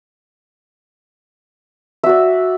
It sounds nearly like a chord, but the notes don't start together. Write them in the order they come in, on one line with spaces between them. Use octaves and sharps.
E5 F#4 D5